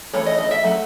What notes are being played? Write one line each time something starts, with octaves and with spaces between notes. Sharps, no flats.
E3 A3 C#5
D#5
D#5
E5
F#3 A3